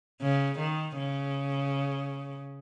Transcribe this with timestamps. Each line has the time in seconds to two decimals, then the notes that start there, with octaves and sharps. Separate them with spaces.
0.21 C#3
0.59 D#3
0.98 C#3